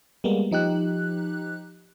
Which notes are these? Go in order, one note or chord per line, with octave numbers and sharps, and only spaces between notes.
G3 G#3 A#3 B3
F3 D#4 G4 F#6